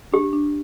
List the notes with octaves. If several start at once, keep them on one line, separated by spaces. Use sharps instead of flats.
D4 G4
D4